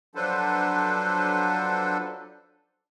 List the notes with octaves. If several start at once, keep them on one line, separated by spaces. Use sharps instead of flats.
F3 F#3 D4 A4 B4 C5